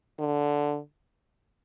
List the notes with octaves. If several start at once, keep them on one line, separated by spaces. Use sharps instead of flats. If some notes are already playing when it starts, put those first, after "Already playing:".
D3